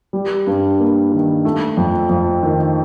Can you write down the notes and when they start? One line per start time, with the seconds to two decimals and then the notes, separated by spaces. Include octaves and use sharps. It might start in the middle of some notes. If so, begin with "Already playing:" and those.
0.13 G3
0.47 G2
0.79 A#3
1.12 D#3
1.45 A3
1.77 F2
2.09 F2
2.43 D#3